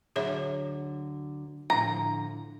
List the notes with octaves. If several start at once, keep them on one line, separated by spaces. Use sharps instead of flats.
D2 D3 F#3 G#4 C#5 E5
A2 D3 F3 A#5